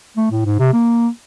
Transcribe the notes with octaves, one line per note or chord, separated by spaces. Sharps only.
A3
A2
G#2
C3
A#3